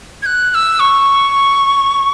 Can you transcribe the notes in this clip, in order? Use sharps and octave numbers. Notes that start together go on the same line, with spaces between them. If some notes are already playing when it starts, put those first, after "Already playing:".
G#6
F#6
F#6
E6
C#6